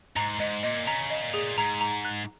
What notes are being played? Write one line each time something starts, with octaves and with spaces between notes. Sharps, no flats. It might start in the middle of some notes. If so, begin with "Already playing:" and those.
G#2 A#5
G#2 D#5
A#2 D#5
C#3 A#5
D#5
A#2
G#4
G#2 A#5
A#5
F#6